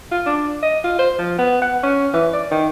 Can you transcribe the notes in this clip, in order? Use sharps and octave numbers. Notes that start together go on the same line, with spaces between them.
F4
D4
D#5
F4
C5
F3
B3
F#5
C#4
E3
D5
D#3